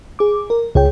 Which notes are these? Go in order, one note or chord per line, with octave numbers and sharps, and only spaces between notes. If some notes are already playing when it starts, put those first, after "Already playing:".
G#4 D6
A#4
C#2 G#4 C#5 G5